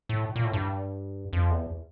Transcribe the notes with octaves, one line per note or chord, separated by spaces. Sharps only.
A2
A#2
A2
G2
F2
E2